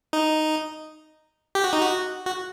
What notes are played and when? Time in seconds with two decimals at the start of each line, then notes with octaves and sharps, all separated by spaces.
0.13 D#4
1.55 G4
1.64 F#4
1.73 D#4
1.82 F#4
2.26 F#4